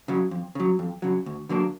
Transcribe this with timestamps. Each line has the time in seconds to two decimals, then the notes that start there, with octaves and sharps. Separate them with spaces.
0.08 C#3 F#3
0.31 F2
0.55 C#3 F#3
0.79 F2
1.02 C#3 F#3
1.26 D2
1.49 D3 F#3 A#3 D4